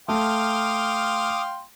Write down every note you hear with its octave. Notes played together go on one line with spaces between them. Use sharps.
A3 F5 G5 C6 D6 D#6 F6